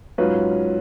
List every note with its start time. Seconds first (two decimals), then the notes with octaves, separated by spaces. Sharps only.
0.18 G#2 F#3 C#4 F4 B4